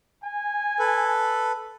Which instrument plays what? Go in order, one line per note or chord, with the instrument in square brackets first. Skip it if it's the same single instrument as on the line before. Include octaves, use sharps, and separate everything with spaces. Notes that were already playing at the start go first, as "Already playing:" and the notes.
[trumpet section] G#5
[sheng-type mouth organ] A4 B4